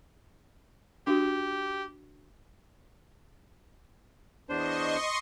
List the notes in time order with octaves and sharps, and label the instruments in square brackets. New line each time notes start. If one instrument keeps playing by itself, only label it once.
[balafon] D4 F#4 [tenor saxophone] G4
[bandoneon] E2 D4 C5 [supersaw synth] D#5 C6 C#6